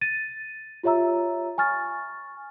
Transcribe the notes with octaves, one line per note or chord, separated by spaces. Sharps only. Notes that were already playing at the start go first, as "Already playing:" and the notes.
A6 D#7
F4 G4 C#5 E5 A#5 E6
G#5 C#6 F6 A6